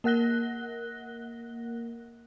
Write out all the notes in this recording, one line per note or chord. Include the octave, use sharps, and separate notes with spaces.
A#3 A#4 F#5 F#6 A#6 G7